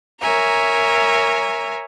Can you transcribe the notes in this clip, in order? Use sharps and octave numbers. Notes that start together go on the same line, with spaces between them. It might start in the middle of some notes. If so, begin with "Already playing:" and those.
A#4 C#5 E5 G#5 A#5